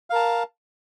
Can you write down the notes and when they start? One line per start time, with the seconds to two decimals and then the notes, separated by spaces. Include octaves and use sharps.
0.10 F5
0.13 A#4
0.15 A5